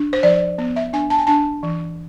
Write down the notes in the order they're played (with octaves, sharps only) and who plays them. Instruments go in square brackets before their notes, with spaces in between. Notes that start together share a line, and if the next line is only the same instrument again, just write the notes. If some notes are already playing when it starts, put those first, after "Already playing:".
Already playing: [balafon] D4
C5
F3 D5
B3
E5
D4 G#5
A5
G#5
D4 A5
E3